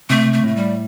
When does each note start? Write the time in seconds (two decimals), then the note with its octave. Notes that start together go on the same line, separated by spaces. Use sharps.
0.10 C3 A3
0.33 A3
0.43 A2 A3
0.56 G3